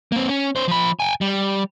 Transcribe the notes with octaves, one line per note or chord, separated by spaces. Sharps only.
A#3 C4
C#4
C#4 C5
F3 B5
G5 G#5
G3